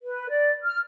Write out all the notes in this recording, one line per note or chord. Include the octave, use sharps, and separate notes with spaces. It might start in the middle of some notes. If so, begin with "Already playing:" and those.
B4
D5
F6